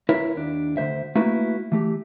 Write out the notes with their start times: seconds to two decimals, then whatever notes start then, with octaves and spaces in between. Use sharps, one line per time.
0.09 E4 A#4 B4 C#5 E5
0.35 D#2 D4
0.77 D2 D#3 C5 E5
1.15 A3 A#3 E4 F#4 B4
1.72 E3 A3 G4